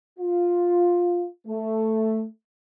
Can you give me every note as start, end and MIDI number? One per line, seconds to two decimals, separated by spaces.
0.19 1.25 65
1.48 2.24 57